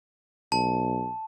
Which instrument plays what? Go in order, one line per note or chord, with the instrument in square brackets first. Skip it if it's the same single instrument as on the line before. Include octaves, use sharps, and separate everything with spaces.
[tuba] B1 [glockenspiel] A5